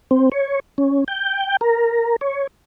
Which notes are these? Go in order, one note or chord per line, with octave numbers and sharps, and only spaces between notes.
C4
C#5
C#4
G5
A#4
C#5